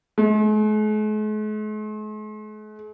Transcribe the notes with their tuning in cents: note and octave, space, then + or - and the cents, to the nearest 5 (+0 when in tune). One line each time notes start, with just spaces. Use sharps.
G#3 +45